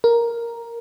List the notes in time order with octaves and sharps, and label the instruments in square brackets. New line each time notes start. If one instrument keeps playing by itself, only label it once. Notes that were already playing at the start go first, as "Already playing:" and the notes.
[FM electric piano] A#4